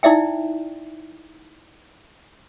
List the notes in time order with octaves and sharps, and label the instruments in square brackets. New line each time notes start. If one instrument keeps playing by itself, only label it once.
[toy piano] D#4 E4 D5 E5 G5